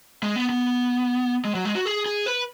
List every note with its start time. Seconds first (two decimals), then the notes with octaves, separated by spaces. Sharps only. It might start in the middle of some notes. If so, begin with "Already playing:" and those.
0.23 G#3
0.36 B3
0.49 B3
1.45 G#3
1.55 F#3
1.65 G#3
1.75 F#4
1.85 G#4
2.06 G#4
2.26 B4